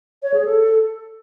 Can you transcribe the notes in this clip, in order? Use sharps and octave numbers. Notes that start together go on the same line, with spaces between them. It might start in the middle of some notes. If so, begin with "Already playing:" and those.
C#5
G#4
A4